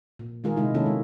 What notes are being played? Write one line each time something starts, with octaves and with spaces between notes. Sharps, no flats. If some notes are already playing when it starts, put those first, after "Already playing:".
A#2
D#3 G#3 F4 G#4 A#4
C3 G#3 D#4 E4
D#3 A#3 C#4 E4 F4 A4
G#3